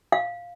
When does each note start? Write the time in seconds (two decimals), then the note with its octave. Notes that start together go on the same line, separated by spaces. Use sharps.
0.12 F5